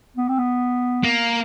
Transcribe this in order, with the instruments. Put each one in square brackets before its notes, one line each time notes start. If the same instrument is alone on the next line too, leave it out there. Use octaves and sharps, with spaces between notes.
[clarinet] B3
C4
B3
[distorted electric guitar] A#3